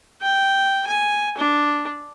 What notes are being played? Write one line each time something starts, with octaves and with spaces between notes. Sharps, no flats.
G5
G#5
D4